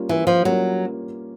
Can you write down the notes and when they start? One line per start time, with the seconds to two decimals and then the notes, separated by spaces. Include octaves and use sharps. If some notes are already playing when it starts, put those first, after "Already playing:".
Already playing: G3 A#3 C#4 F4
0.09 E3
0.27 F3
0.45 F#3 G3 A#3 C#4 F4